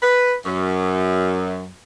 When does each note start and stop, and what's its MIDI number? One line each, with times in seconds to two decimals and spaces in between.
0.02 0.35 71
0.46 1.69 42